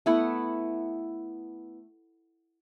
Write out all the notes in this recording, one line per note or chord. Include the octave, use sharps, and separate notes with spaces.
A3 B3 E4 F#5